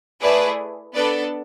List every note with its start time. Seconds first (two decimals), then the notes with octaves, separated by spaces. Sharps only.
0.21 A3 E4 G#4 B4 D5
0.94 B3 D4 A4 B4 D5